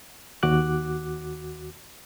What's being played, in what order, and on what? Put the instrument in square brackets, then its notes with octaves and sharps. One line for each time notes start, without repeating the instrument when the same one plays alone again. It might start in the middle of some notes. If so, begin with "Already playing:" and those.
[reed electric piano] D#2 F#4 D6 F#6